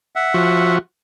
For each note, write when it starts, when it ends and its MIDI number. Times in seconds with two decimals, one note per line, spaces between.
0.16 0.76 76
0.16 0.76 78
0.34 0.78 53
0.34 0.78 66